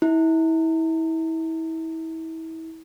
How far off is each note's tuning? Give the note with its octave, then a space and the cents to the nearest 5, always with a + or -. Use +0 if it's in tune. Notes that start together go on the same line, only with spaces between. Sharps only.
E4 -30